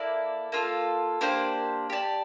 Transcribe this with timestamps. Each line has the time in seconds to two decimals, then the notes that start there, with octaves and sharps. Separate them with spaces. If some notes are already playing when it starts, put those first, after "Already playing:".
Already playing: A#3 E4 A4 D5
0.52 A#3 F4 A4
1.21 A#3 D4 G4 C5
1.90 G4 D5 A5